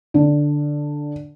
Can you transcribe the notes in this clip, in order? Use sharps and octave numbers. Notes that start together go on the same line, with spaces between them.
D3